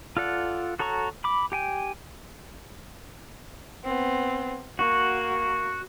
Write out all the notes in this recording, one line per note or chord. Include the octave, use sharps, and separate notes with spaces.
F4 A4 D5 F#5
F#4 A4 C#5 A#5 C#6
B5 D6
G4 G5 G#5
B3 C4
A#3 F#4